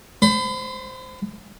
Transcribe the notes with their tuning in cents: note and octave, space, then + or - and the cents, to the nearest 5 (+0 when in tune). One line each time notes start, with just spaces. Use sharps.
C5 -5 B5 +35